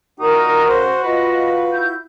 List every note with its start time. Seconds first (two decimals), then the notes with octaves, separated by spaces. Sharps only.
0.20 A#2 D#4 F#4 A#4
0.69 C#3 C5
1.03 F4 B4 D#5 B5
1.70 E4 G6